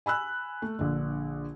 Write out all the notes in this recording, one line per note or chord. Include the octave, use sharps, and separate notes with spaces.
G#5 B5 E6 F#6
A3
A#1 D3